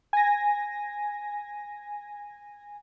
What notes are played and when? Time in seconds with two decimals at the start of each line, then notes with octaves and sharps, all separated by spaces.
0.13 G#5 A#6